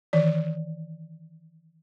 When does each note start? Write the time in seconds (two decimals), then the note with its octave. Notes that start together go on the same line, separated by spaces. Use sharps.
0.13 D#3 E3 D5